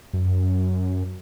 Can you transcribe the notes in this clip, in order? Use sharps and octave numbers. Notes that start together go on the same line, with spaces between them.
F#2